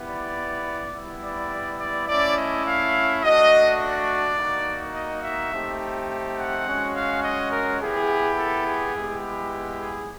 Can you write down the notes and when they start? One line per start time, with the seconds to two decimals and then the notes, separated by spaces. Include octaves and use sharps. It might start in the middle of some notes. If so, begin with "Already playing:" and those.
Already playing: B3 E4 G4
0.08 D5
0.94 G3 B3 E4
1.23 D5
1.79 D5
2.08 A3 C#4 E4 D5
2.36 D#5
2.66 F5
3.22 A3 D4 F#4 D#5
3.80 D5
4.37 A#3 D#4 F#4
4.95 D#5
5.23 E5
5.52 A3 C4 D#4 G4
6.37 F#5
6.67 G#3 C#4 F#4
6.95 F5
7.23 D#5
7.52 A#4
7.81 B3 E4 G4 G#4
8.38 A4
8.66 G#4
8.96 G#3 B3 E4 G4
9.81 G#4